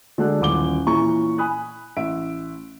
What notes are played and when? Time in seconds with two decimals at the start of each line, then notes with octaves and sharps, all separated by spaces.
0.18 D3 G#3 D4 F#4 A4 F#6
0.41 D#1 A1 D6 G7
0.87 A#2 E3 C#4 E4 A#5 C#6
1.38 G#5 B5 D#6 F#6
1.97 A1 E5 D7